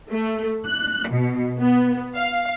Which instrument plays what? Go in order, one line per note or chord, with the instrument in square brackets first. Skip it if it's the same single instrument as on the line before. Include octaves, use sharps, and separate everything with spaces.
[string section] A3
F#6
B2
B3
F5